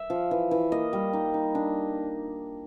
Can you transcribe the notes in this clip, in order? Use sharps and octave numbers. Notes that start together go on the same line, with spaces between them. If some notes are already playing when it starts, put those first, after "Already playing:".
Already playing: E5
F3
E3
E3
A#3 D#5
G3
D#4
D#4
D4